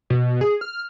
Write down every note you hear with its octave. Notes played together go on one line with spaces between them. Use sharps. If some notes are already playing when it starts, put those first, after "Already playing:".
B2
G#4
F6